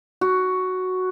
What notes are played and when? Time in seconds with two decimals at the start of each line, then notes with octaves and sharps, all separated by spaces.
0.21 F#4